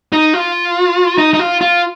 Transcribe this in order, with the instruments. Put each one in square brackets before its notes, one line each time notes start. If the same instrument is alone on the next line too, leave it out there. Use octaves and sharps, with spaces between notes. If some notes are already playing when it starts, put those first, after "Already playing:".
[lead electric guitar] D#4
F4
D#4
D#4
F4
F4